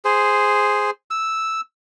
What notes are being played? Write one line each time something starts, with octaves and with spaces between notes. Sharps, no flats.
G#4 C5
E6